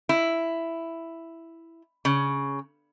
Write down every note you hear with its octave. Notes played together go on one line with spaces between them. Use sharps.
E4
C#3